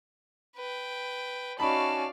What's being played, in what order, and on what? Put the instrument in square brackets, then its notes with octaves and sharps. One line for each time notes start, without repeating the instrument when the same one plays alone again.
[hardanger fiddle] B4 G5
[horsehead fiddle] C#4 F#4 [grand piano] D#4 B5 F#7 [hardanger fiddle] D5 F5 [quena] A5